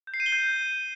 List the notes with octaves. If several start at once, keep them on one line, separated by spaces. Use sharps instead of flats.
G6
C7
D#7
G7
G6